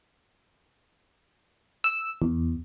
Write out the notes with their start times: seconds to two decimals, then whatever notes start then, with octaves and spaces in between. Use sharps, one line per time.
1.84 E6
2.22 E2